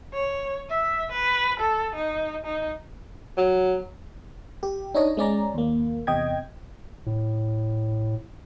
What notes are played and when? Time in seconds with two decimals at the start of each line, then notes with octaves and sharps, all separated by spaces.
0.13 C#5
0.70 E5
1.12 B4
1.60 A4
1.95 D#4
2.45 D#4
3.37 F#3
4.63 G4
4.95 D4 D#4 C#5 D#5
5.17 G#3 C#4 D5 A#5
5.54 D#2 A#3
6.07 E2 C3 D#5 G5 G#6
7.06 A2